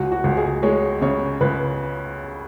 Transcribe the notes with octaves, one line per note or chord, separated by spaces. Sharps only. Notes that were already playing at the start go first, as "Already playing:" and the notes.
Already playing: C#2 F#4
F#4
C#2
G#4
G#3 C#5
C#3 C#5
C#2 B4